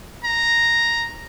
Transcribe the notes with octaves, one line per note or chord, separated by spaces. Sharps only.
A#5